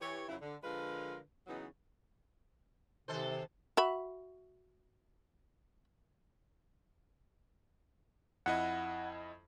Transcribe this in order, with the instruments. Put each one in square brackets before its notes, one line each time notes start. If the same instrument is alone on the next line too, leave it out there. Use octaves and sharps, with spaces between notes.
[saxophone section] E3 G4 C#5
F#2 C#3 F3 F#3 E4
D3
D3 F3 G#3 F4 A#4 B4
C#3 E3 F#3 B3 D#4
[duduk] C3 [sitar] D#3 A4 C5
[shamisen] F#4 E5 B5
[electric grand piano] F2 E4 D#5 [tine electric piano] F#5